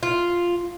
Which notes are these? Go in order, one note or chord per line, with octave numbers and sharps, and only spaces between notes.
F4